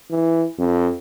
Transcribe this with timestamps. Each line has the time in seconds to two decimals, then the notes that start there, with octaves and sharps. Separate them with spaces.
0.10 E3
0.59 F2